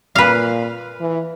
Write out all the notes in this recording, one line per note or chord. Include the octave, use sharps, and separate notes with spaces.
A#2 B4 F5
E3